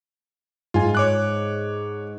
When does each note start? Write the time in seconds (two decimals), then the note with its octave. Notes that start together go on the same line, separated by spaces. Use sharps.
0.74 G#2 F4 G#5
0.95 C#5 D6 F#6